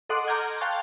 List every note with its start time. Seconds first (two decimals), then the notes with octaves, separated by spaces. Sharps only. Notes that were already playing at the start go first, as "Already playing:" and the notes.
0.09 A4 D#5 F#5 C6 D6
0.28 A#5 D6 F6 G6 G#6
0.61 F5 G5 A5 C6 C#6 F#6